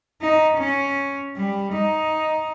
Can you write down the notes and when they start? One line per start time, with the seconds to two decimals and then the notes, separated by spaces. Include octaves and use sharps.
0.22 D#4
0.57 C#4
1.36 G3
1.74 D#4